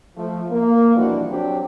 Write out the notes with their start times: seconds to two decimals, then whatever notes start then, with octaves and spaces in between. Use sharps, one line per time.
0.17 F3 A3
0.51 A#3
0.95 B2 E3 F3 G3 D4 F#4
1.31 F#3 C4 D4 F#4 G4